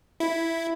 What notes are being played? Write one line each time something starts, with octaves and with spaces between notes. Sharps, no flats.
E4